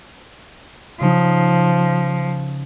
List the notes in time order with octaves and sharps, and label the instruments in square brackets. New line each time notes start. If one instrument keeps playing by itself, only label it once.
[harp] C#3 D#4 [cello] F3